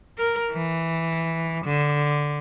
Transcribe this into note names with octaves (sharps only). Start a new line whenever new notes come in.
A#4
E3
D3